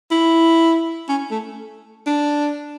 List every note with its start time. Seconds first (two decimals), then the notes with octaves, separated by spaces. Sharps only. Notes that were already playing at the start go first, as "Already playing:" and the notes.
0.11 E4
1.09 C#4
1.31 A3
2.06 D4